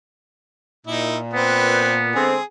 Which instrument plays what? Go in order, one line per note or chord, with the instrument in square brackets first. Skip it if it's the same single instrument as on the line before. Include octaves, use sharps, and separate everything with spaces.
[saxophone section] A#2 [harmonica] D#4 E4
[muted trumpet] B3 [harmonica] C4 B4
[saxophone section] D3 G#3 C4 [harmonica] G#4